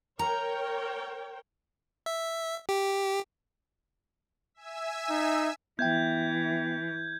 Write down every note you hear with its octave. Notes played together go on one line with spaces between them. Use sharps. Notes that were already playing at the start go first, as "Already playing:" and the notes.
A#4 C#5 G5 A#5
E5
G4
E5 G#5 E6
D#4
E3 B3 E5 G5 G6 G#6